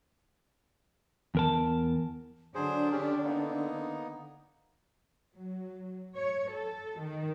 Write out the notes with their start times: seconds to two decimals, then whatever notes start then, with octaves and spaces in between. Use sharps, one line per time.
1.35 E2 A#4 A5
2.55 D3 F#3 D4 G#4 C5
2.92 C#4 G4
3.24 A#3 B3 D#4
5.35 F#3
6.16 C#5
6.51 A4
7.00 D#3